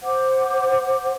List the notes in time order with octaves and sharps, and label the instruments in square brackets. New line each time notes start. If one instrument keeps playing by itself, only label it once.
[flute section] C5 F#5 D6